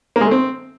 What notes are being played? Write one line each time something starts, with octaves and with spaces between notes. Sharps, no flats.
A#3
G#3
A3
C4